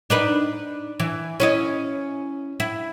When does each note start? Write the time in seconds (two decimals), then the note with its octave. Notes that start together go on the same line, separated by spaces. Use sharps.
0.10 D4 D#4 B4
1.00 E3
1.40 C#4 E4 D#5
2.60 E4